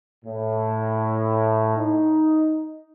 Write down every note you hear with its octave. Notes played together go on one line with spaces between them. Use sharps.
A2
D#4